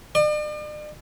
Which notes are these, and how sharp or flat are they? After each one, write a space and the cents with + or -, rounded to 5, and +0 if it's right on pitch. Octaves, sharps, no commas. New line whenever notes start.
D5 +45